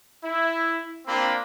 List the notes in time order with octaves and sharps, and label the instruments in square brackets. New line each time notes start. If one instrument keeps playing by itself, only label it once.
[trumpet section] E4
A#3 C4 D4 F4 B5